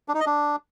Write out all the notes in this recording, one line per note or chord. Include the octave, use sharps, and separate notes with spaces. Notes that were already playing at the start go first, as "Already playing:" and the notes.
D4
D#4
D#5
D4